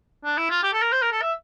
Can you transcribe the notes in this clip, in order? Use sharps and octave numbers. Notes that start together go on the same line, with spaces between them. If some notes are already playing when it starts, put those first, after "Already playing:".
D4
E4
F4
G4
A4
A#4
C5
A#4
A4
E5